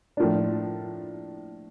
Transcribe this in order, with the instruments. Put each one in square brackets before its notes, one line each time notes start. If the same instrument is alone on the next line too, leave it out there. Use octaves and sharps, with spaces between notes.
[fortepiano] A2 F3 A#3 D4